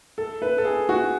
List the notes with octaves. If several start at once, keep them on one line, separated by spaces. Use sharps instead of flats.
A4
B4
A4
G#4
F#4